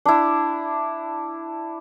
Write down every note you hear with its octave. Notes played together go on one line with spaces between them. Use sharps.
D4 E4